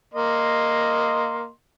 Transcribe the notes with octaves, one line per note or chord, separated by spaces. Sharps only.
A#3 D#5 C6